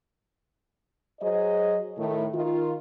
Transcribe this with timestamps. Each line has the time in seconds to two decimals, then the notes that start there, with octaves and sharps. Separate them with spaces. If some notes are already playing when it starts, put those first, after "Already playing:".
1.20 F#3 G#4 C5 D#5
1.98 A2 D#3 A3
2.33 D#3 F4